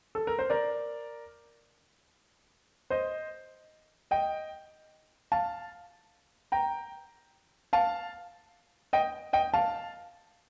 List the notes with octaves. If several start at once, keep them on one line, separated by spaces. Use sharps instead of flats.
A4
A#4
C5
A#4 D5
C5 D#5
D#5 G5
F5 A5
G5 A#5
F5 A5
D#5 G5
D#5 G5
F5 A5